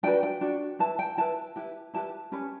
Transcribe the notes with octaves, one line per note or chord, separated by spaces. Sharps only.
D4 F#4 B4 G5
G5
D4 F#4
E4 B4 A5
G5
E4 B4 A5
E4 G4 B4
E4 G4 B4 A5
C#4 G4 B4